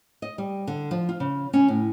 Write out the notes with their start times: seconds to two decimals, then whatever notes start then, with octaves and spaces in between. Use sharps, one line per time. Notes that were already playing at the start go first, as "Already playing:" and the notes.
0.22 D#5
0.38 G3
0.67 D3
0.91 F3
1.09 F4
1.20 C#3
1.53 C#4
1.68 A2